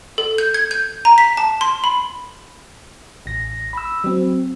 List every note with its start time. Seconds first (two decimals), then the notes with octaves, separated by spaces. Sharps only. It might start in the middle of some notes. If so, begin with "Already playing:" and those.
0.18 A4
0.38 G6
0.54 G#6
0.71 G6
1.05 A#5
1.18 B6
1.37 A5
1.61 C6
1.84 B5
3.26 A1 A#6
3.73 B5 E6
4.04 F#3 C4